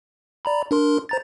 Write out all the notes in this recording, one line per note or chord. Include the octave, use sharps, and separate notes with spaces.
D5 A#5 B5
D4 A#4 C6
C5 A#5 A6